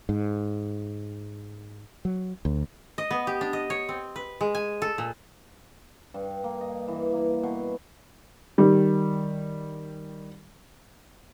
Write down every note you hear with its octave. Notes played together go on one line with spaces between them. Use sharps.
G#2
F#3
D2
D#5
B3
G4
D4
D#5
C#5
C4
B4
G#3
G#5
A4
A#2
G2
A#3
D#5
E3
A#3
B2
D#3 G3